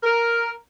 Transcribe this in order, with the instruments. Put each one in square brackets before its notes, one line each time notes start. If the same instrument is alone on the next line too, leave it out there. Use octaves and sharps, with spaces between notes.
[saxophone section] A#4